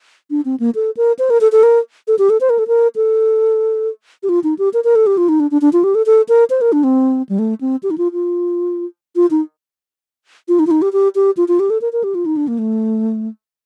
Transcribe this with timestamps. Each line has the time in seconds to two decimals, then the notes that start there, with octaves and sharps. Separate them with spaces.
0.31 D4
0.45 C4
0.60 A#3
0.75 A4
0.97 A#4
1.19 C5
1.30 A#4
1.41 A4
1.52 A4
1.63 A#4
2.08 A4
2.19 G4
2.30 A4
2.41 C5
2.50 A#4
2.59 A4
2.68 A#4
2.96 A4
4.23 G4
4.29 F4
4.44 D#4
4.59 G4
4.74 A#4
4.84 A#4
4.95 A4
5.07 G4
5.17 F4
5.29 D#4
5.40 D4
5.51 D4
5.62 D4
5.73 F4
5.84 G4
5.95 A4
6.06 A4
6.29 A#4
6.50 C5
6.61 A#4
6.72 D4
6.84 C4
7.29 G3
7.39 A3
7.61 C4
7.83 G4
7.91 D#4
7.98 F4
8.13 F4
9.16 F4
9.31 D#4
10.48 F4
10.59 D#4
10.67 F4
10.71 D#4
10.82 G4
10.93 G4
11.15 G4
11.37 F4
11.48 F4
11.60 G4
11.70 A4
11.82 A#4
11.93 A#4
12.04 G4
12.15 F4
12.26 D#4
12.37 D4
12.48 A#3
12.59 A3